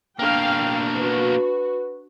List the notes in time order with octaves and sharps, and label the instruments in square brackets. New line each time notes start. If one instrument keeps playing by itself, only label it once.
[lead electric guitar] B2 A#3 [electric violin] D4 [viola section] F5 G5
[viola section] F#4 [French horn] B4